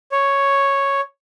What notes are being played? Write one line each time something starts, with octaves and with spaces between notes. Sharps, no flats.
C#5